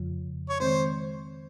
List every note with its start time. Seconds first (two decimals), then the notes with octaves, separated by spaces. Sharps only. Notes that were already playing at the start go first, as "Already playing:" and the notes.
Already playing: F2 C#3 F3
0.49 C#5
0.60 D#3 G#3 C4 C5